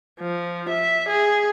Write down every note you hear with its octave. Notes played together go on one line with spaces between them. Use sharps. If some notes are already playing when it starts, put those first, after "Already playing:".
F3
E5
G#4